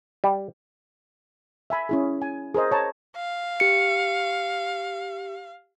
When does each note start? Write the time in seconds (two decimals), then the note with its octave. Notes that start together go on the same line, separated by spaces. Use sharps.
0.24 G3
1.70 E5 G#5 B5
1.89 C#4 E4 G#4
2.22 G#5
2.55 G#4 A#4 C5 D#5
2.71 C#5 A5 A#5
3.16 F5
3.60 G4 C#7